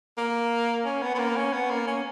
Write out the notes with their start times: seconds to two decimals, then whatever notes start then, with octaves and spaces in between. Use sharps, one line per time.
0.18 A#3
0.85 C#4
1.02 B3
1.15 B3
1.19 A#3
1.36 C#4
1.53 B3
1.70 A#3
1.87 C#4